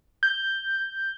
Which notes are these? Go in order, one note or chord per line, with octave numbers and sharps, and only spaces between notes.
G6